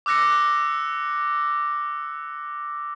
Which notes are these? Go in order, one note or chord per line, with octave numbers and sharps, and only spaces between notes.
D6 E6 F#6 A#6 C#7